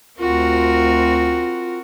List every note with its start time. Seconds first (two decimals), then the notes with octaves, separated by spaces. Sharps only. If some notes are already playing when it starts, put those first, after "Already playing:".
0.19 D2 C4 F4 F#4 A#4